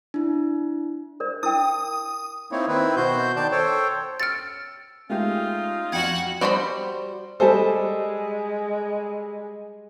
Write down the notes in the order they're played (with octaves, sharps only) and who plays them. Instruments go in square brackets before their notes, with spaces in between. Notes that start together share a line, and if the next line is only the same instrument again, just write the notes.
[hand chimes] D4 E4
[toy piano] A#4 C5 D5
[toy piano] E4 A#4 G5 [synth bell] D#6
[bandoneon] A#3 C4 D#4 E4 C#5
D#3 C4 E4 B4
B2 F#4 C5 G6
D#3 D5 A5 G6
A4 C5 C#5 G5
[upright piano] E6 C#7 D7 [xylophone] F6 A6
[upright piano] G#3 A3 G4 [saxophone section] C#4 D#4 F4
[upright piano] F2 [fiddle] F#4 F#5 [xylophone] G5 G#6
[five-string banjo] G3 F#4 C5 A5 B5
[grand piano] G3 A4 [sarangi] G#3 [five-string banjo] C5 G#5 A5